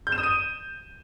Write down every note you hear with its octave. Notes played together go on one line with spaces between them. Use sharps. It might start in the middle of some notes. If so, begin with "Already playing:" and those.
G6
E7
D#6
D#7